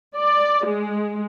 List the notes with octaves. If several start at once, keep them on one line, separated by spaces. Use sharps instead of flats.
D5
G#3